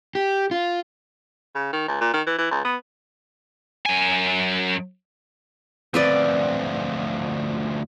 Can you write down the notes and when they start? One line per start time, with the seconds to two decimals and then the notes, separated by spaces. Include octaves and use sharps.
0.15 G4
0.51 F4
1.55 C#3
1.73 D#3
1.88 C#2
2.01 A#2
2.14 D#3
2.27 E3
2.38 E3
2.51 C#2
2.65 B3
3.86 F#2 G#5
5.94 D2 F3 C4 B4 D5